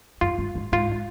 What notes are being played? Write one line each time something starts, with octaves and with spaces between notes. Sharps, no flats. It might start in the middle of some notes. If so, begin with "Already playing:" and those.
F#2 F4
G2
G#2
G#2 F4